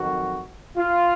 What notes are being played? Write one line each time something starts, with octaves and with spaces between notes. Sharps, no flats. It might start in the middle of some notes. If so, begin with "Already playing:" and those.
Already playing: F2 D#3 F#3 F#4
F4